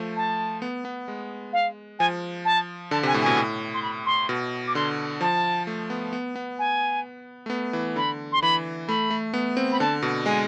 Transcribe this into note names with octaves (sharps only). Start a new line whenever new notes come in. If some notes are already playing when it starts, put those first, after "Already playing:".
Already playing: F3 A3
A5
B3
B3
G#3
F5
F3 G#5
A5
D3 A5
C3 G#5
A2
B2 G#5
A2
C6
B5
C6
B2
D6
D3 C6
F3 A5
A3
B3
B3
B3
G#5
A3
B3
E3
D3 B5
C6
E3 B5
A3 B5
A3
B3
C4
B5
D3 A5
B2
G#3 G#5